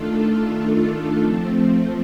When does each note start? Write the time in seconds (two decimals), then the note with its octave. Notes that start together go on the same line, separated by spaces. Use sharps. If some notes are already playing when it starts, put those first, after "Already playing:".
Already playing: D#3 A3 D4 F4 A4
1.21 F3 A3 C4